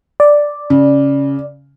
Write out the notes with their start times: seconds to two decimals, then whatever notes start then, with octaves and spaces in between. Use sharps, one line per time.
0.20 D5
0.70 C#3